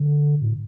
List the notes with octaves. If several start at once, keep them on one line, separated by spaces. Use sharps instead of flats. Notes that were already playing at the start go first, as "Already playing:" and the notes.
Already playing: D3
A2